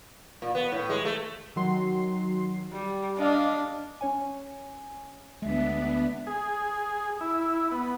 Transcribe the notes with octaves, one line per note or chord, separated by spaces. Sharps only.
A#2
B3
A2
G#3
A3
D#3 F#3 C6
G3
D4 D5 D#5 F5
C#4 C#5 G#5
D2 G#3 B3 D4 E5
G#4
E4
B3